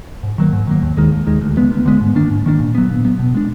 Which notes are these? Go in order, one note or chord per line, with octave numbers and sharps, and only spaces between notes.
G#2
D#3 F#3 A#3
G#2
D#3 F#3 A#3
D#2
D#3 G#3
D#2
D#3 G#3
D2
D3 G#3 B3
D2
D3 G#3 B3
G#2
D#3 A#3 D4
G#2
D#3 A#3 D4
A#2
F#3 B3
A#2
F#3 B3
B2
G#3 D4